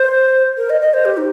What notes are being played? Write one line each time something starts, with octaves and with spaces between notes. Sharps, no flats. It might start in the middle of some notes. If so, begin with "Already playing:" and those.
Already playing: C5
A#4
D#5
D#5
C5
G4
D#4